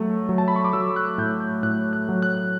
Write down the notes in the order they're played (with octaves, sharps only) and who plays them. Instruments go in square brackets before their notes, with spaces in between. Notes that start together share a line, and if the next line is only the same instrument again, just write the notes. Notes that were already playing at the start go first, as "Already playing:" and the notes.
Already playing: [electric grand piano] F#3 A3
F#3
A5
B5
C#6
D6
F#3 E6
F#6
A2 G6
G6
A2 F#6
F#6
F#3
F#6